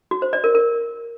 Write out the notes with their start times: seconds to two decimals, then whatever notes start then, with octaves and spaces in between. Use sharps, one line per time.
0.11 F#4
0.22 C5
0.33 D5
0.44 A#4
0.55 A#4